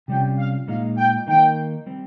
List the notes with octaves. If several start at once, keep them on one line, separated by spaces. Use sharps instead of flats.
C3 G3 C#4 F4 G5
F5
A#2 G#3 D#4 F5
G5
D#3 A#3 D#4 G5
G3 C4 G4